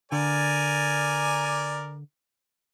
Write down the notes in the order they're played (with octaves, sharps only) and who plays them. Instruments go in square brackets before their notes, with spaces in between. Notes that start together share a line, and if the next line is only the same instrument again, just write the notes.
[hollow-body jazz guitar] D3 [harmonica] A#4 D5 G#5